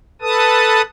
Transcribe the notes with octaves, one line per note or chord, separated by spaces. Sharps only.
A4 B4 A5 D#6